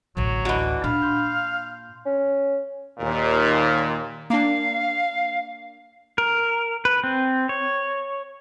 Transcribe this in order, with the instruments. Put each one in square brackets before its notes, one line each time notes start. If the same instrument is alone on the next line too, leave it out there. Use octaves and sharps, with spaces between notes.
[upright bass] A1 D2 [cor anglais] F#3
[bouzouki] D3 E3 [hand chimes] F#4 D#5
[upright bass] A#2 [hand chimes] D4 B5 [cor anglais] F5 [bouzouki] A5
[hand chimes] C6 G6
[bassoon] C#4
[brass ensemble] D#2 A#2
[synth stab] A#3 D4 [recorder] F5
[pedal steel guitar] A#4
B4
C4
C#5